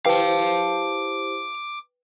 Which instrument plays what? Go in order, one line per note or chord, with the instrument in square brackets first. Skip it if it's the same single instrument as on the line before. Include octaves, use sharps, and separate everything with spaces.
[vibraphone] E4 G4 C5 [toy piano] B4 G5 [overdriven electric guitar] F5 A5 [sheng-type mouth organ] D6